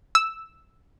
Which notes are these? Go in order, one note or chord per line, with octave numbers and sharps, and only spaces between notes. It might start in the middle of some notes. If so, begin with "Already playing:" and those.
E6